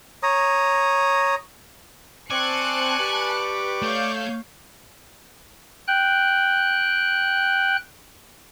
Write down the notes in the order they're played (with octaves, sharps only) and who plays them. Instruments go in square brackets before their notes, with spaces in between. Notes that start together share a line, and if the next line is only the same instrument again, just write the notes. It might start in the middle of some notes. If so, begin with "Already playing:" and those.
[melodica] C#5 A#5 D#6
[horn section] C4 [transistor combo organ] D5 C#6 D6 [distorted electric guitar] G#5 [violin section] A5 F#6 C#7
[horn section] G4 B4
[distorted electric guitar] A3 [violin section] C#5 F5 G6
[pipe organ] G5 F#6